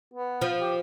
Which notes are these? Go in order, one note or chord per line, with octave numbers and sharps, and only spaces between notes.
B3
F3
G4